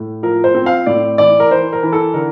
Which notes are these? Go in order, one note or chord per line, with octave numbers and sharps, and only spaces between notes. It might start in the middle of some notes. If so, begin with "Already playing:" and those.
Already playing: A2
F3 A#4
C5
C4
F5
A2 D5
E3 D5
A#4
E3 C5
A#4
E3
A4
D3 A#4